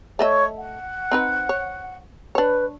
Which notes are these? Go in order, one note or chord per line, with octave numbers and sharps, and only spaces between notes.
A3 C#5 D#5 E5
F#5
C4 D#4 B4
C#5
D4 B4 C#5